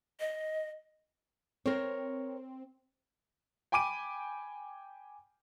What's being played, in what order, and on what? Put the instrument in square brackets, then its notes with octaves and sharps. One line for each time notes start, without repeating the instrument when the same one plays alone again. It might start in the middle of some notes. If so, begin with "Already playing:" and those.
[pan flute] D#5
[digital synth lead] C4 [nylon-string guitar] A#4 C#5
[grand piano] G5 G#5 B5 D6 D7 D#7